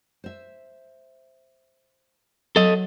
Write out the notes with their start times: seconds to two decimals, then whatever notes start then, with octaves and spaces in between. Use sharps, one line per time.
0.24 C5 E5
2.56 F#3 A4 D#5